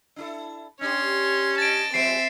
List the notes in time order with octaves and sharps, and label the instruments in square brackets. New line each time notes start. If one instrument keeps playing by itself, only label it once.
[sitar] D4 E4 A4
[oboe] C#4 [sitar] D4 G4 [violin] C#5 C6
[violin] D#5 A5 [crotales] A6 D7
[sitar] F3 G3 G#3 [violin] C4 E5 [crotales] C7 D7